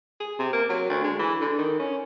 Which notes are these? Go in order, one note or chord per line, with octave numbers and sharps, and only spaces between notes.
G#4
C3
A#3
F#3
D2
G#3
E3
D3
D#3
C#4